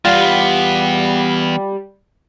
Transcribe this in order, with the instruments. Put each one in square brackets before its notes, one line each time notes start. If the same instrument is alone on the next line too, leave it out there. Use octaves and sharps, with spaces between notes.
[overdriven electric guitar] E2 B3 [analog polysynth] G3 [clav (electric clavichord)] F4